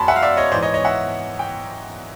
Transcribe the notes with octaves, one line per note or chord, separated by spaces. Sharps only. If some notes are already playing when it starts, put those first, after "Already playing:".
Already playing: F#2 A5 B5 C6
E5 F#5
F5
D5 E5
C#5 D#5
G#2 E3 C5 D5
C#5 D#5
C#5 D#5
E5 F#5
G5